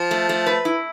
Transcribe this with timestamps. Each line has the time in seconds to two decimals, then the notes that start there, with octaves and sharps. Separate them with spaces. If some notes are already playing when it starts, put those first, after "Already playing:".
Already playing: F3
0.11 A3
0.29 A3
0.46 B4
0.65 E4